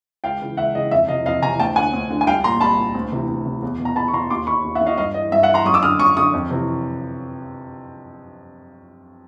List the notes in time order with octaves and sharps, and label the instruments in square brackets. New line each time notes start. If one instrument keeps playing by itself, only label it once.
[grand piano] C#2 F5 G5
C#3 E3
C#2 E5 F#5
C#3 E3 D#5
F2 E5
C3 E3 D#5 F5
F2 D#5 F5
C3 G#5 A#5
E3
D2 G5 A5
D3 F#5 G#5
D2
D3
G#5
C2 F5 G5
A#2 A#5 C6
C2 A5 B5
A#2
D2
C3 E3
D2
C3 E3
E2
B2
A#5
E2 A5 B5
C#6
B2 A#5 C6
D#2 C6 D6
D#3 B5 C#6
D#2
E5 F#5
D#3
D#5 F5
G2 D#5 F5
E3 D#5
G2 E5
E5 F#5
E3
A#5 C6
F#2 C#6 D#6
D6 E6
D3 D#6 F6
F#2 C#6 D#6
D3 C#6 D#6
F2
C3 E3